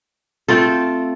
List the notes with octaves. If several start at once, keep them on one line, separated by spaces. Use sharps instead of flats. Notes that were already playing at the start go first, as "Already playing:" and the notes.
A3 C4 F4 A4